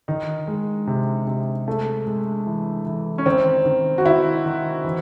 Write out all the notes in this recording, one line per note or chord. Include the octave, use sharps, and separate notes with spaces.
D#3 D#4
G#3
C3
C3
G#3 A3
G#3
E3
E3
C#4
D#3 C4
D#3
F#4
D#3 E4
D#3
E3